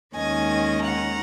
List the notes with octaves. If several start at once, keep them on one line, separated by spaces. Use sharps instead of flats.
D#2 D#3 G#3 C#4 D#5 G#5
F#5 A#5